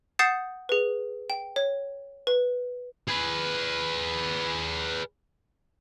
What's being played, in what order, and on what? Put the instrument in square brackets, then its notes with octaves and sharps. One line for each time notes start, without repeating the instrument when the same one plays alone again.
[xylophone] F#5 D#6 G6 A6 C7 E7
G#4 B4
G5
C#5
B4
[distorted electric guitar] G#4 B4